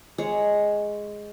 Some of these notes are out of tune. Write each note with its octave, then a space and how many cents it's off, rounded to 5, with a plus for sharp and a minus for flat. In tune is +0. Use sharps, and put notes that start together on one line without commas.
G#3 +0 C#5 +0